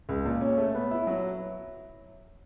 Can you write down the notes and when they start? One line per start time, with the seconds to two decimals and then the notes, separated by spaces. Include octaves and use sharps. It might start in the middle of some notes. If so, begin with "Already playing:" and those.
0.09 C#2
0.25 A#2
0.41 C#4
0.58 A3
0.74 B3
0.91 E4
1.07 F#3